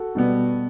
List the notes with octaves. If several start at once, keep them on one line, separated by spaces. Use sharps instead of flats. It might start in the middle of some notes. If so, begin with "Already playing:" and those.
Already playing: F#4 A4
B2 G3 B3